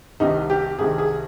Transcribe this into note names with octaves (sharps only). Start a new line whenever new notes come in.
C2 C3 D#3 D#4
G4
C2 C3 D#3 G#4
G#4